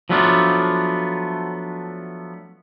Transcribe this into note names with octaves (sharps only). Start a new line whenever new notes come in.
F3 F#3 A3 B3 D4 F4